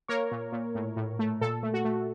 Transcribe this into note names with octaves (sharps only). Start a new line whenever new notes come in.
A#3 A#4 C#5
A#2
A#2
A2
A2
A3
A#2 A4
A3
F#4
A3